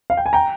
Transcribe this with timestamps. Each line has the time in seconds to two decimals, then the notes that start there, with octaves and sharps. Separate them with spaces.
0.10 F5
0.17 G5
0.26 G#5
0.33 G5 A#5